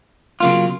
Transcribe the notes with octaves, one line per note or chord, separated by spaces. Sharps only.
C#3 F#3 A#3 F4